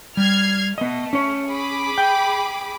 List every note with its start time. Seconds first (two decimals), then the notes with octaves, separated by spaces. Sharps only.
0.17 G3 F6 G#6 C7
0.78 A3 B3 D#5
1.13 C#4 C#5
1.51 G#4 B5 D6
1.98 G5